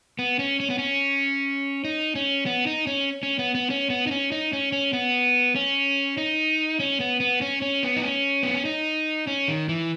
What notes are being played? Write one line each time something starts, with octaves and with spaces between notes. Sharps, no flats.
B3
C#4
C#4
B3
C#4
D#4
C#4
B3
D#4
C#4
C#4
B3
B3
C#4
B3
D#4
C#4
D#4
C#4
C#4
B3
C#4
D#4
C#4
B3
B3
C#4
C#4
B3
D#4
C#4
B3
C#4
D#4
C#4
D#3
E3